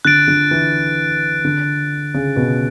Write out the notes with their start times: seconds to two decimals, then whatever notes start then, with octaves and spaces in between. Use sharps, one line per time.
0.05 D3 F#6 A6 D7
0.28 D3
0.51 E3
1.45 D3
2.14 C#3
2.36 B2